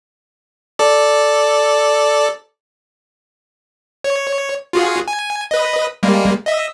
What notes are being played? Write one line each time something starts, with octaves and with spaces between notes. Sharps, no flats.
A4 D5
C#5
F4 F#4 G#4
G#5
B4 D#5
G3 G#3 A#3
D#5 E5